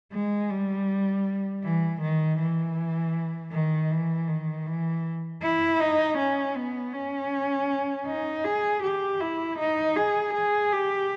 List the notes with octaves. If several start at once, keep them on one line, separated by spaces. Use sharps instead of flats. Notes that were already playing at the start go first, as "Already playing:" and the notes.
G#3
G3
E3
D#3
E3
D#3
E3
D#3
E3
E4
D#4
C#4
B3
C#4
D#4
G#4
G4
E4
D#4
G#4
G#4
G4